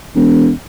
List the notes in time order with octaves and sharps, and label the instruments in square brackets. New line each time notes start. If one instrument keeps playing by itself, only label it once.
[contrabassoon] E1